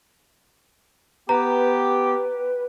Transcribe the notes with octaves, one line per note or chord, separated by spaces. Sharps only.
B3 G4 B4 A#5